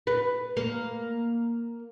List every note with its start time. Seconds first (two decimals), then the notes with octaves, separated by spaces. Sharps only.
0.07 B4
0.57 A#3